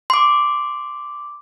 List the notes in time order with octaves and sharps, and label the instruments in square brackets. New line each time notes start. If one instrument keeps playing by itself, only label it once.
[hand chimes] C6 D6